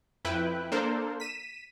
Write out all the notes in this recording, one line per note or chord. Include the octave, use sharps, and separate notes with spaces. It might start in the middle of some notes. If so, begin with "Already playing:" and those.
F2 E4 B4 G5 F#6
A#3 D4 A4 A#4 C5
B6 D#7 E7